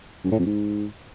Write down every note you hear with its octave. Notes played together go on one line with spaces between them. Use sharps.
F#2
A2
F2
G#2